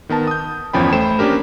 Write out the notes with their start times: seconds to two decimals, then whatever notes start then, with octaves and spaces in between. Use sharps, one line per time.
0.09 D#3 B3 A#4 A5
0.27 D#6 G6
0.73 G1 E2 F3 C#4 G5 B5
0.93 A3 C5 G5 B5 E7
1.19 A#3 C#4 D4 G4 A#4